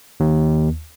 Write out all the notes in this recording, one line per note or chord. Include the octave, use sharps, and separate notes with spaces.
D#2